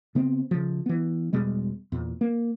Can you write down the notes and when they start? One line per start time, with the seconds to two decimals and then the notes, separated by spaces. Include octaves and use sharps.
0.15 C#3 B3 C4
0.51 C#3 F3
0.86 E3 B3
1.33 E1 B2 G3 G#3
1.92 E2 A#2
2.21 A#3